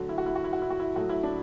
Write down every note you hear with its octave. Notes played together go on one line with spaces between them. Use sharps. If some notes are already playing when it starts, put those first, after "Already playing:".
Already playing: D3 F#3 A3 F#4
E4
F#4
E4
F#4
E4
F#4
E4
F#4
E4
A2 F#3 A3 F#4
E4
D4